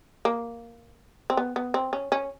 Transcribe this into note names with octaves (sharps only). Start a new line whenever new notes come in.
A#3
C4
B3
B3
C4
C#4
C#4